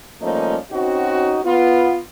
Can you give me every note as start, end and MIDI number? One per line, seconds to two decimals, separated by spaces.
0.21 0.56 53
0.21 0.56 55
0.21 0.56 57
0.21 0.56 58
0.21 0.56 61
0.21 0.56 63
0.71 1.39 60
0.71 1.39 61
0.71 1.39 63
0.71 1.39 66
1.45 1.98 59
1.45 1.98 65